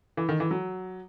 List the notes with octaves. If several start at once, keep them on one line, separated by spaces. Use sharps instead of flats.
E3
D#3
E3
F#3